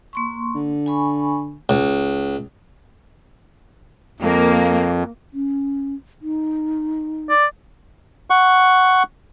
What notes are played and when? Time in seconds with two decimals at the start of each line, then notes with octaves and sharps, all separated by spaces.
0.13 A#3 C6 C#6
0.55 D3
0.86 G#5 B5 C#6
1.69 C#2
4.20 F2 A#3
5.34 C#4
6.22 D#4
7.30 D5
8.30 F#5 C#6